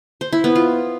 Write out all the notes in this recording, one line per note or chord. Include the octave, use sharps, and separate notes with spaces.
C5
E4
B3
F4